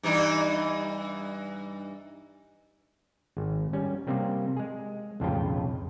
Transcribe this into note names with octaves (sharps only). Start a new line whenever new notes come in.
G2 E3 D#4
G#1
G3 C#4
C3 G3 A#3 C4
G#3 G#4
B1 F2 A2 C#3 F4 G5